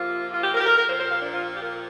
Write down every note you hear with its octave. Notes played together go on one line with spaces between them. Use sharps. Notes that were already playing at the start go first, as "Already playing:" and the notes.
Already playing: C3 F3 A#3 F4
F4
G4
A#4
G4
A#4
A#4
A#2 F3 C4 C5
C5
F5
D4
F4
G4
A#4